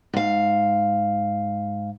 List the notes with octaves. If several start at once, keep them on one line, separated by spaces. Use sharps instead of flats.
G#2 F5